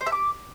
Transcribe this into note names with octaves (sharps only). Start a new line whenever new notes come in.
C5
E5
D6